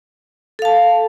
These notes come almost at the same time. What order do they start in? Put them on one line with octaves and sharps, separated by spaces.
A4 F5 A5